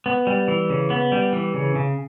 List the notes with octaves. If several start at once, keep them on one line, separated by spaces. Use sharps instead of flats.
B3
G3
E3
C#3
B3
G3
E3
C#3
C#3